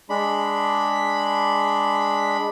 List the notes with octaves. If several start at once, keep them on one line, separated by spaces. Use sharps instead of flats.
G#3 D4 B5